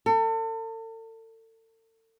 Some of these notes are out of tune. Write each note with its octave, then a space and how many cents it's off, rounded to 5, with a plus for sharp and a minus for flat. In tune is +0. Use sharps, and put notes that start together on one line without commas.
A4 +40